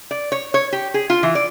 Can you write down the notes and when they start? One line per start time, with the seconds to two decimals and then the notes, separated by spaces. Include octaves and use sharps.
0.11 D5
0.32 C#5
0.54 C#5
0.73 G4
0.94 G#4
1.10 F4
1.23 E3
1.35 D5